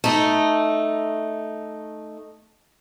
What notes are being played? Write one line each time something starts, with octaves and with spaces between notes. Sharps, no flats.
A3 D#4